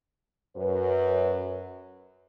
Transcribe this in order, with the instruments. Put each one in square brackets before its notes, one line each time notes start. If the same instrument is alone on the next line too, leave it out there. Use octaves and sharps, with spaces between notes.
[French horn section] F#2 B4